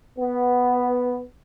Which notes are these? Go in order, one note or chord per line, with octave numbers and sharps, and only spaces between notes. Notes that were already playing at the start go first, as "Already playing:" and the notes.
B3